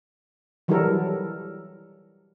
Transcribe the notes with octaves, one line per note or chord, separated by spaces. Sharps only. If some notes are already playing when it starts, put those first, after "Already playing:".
E3 F#3 G3 E4 A4 A#4